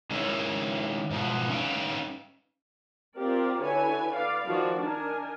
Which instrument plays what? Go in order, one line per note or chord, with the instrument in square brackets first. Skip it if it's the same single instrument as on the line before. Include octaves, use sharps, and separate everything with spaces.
[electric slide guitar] D#3 G#3 C#4 E4
G#2 B2 F3 B3
C#4 D#4 B4 F5 G5
[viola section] C4 F4 G4 A#4 D5
D3 E4 F#4 B4 C#5 G#5
B4 D5 F5
D#3 F3 F#4 D5
D4 D#4 A#4 G#5